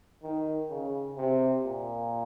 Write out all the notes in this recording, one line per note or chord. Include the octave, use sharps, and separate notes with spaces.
D#3
C#3
C3
A#2